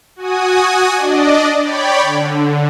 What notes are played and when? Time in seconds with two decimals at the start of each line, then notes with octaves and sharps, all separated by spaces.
0.16 F#4 G#5 D#6
0.95 D4 D5 D#5
1.63 C#5 D5 G5 B5
2.00 D3